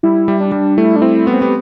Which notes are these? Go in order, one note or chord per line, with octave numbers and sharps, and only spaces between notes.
G3 E4
G3
D4
G3
A3 E4
D4
C4 E4
B3 F#4
C4
B3 G4